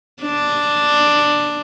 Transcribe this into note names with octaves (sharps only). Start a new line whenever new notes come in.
D4